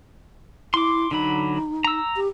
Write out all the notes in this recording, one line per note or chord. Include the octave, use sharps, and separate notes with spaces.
E4 C6 D6
D3 F#3 D#4 B5
A#5 E6
G4